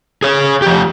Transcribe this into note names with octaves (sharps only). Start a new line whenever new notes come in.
G#4 C#5
F3 G4